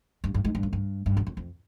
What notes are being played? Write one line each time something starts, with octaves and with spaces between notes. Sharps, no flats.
G2
G2
G#2
G2
F#2
G2
G2
F#2
F2
F2